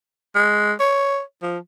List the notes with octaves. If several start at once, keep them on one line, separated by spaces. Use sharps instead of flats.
G#3
C#5
F3